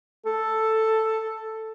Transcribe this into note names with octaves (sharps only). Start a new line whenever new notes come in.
A4